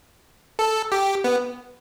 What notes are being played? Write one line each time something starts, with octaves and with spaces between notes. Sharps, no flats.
A4
G4
B3